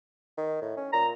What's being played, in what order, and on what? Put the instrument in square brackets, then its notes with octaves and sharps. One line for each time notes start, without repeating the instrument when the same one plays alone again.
[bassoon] D#3
A2
C#4
[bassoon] A#2 [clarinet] A#5